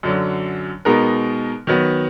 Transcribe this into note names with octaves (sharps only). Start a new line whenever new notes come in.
F#2 D3 F#3
B2 G#3 B3 D#4 A#4
D#3 F#3 B3